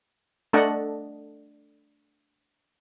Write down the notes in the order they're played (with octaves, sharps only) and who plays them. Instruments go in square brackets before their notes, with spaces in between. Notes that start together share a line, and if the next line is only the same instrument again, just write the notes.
[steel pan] A3 D4 A4 D#5 F#5 A5